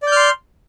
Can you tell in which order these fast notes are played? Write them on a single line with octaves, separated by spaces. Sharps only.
D5 G6 F6 C6